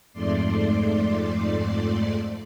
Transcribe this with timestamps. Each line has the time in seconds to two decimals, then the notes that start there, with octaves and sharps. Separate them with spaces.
0.13 F2 G#2 A3 D5 C6